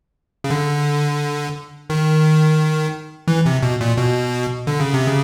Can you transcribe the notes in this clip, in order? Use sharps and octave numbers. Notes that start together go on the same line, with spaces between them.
C#3
D3
D#3
E3
C3
B2
A#2
B2
D3
C#3
C3
C#3